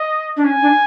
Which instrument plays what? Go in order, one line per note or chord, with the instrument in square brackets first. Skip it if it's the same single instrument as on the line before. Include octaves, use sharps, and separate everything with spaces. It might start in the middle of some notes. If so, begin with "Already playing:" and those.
Already playing: [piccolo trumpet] D#5
[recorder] D4
[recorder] C#4 [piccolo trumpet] G#5
[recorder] D4